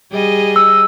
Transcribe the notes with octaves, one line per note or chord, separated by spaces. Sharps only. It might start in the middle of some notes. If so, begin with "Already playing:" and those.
G3 G#4 D#5
E6